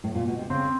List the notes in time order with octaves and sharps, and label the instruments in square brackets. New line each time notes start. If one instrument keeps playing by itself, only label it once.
[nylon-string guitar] A2
A#2
B2
C3
[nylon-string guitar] C#3 [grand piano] C4